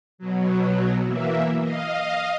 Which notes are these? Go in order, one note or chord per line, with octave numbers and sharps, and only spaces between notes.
B2 F#3
E3 A#3 E4
D#5 F5